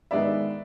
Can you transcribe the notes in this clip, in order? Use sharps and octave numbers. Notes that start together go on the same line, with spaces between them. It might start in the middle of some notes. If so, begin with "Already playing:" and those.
D#3 G#3 B3 D5 E5